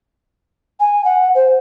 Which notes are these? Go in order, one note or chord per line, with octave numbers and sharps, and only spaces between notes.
G#5
F#5
C5